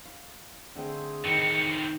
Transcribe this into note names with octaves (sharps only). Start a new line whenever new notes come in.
F5
D3 A3 C4 G#4
A2 D#3 C4 D#4 C#7